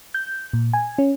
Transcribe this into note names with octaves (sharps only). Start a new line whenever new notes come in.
G6
A#2
G#5
C#4